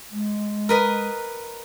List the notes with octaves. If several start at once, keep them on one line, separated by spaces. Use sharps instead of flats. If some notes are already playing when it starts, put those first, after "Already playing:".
G#3
A#4 B4 D#5